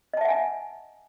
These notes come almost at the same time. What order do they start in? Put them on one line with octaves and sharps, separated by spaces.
D#5 A5 E5 F#5 G#5